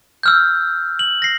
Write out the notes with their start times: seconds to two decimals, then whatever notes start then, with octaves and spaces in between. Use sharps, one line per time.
0.23 E6 F6 G6
0.99 F#7
1.22 A#6 C7